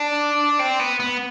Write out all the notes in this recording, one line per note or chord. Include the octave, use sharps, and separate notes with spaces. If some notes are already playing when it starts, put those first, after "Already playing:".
Already playing: D4
C4
B3
B3